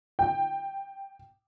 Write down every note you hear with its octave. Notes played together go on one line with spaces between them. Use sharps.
G5